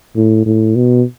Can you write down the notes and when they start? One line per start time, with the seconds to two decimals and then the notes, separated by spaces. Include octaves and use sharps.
0.16 A2
0.46 A2
0.76 B2